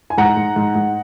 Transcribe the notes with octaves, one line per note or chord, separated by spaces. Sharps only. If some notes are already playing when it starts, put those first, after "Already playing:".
G#5
G#2 F#5 A#5
G#2
G#2
G#2